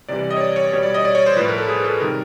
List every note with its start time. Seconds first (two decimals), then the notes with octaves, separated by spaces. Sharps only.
0.08 C3 E3 G3 D5
0.19 D5
0.31 D#5
0.37 C#5
0.41 D5
0.56 C#5
0.72 B2 G3 C#5
0.83 D5
0.94 D#5
1.05 D5
1.15 C#5
1.26 C5
1.36 A2 F3 B4
1.48 A#4
1.58 A4
1.68 G#4
1.84 A4
2.00 C3 D#3 G3 A#4